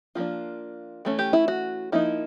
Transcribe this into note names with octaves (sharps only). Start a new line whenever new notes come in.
F3 A#3 D4 F4
E3 A3 C#4
G4
E4
F#4
F3 A#3 D#4 E4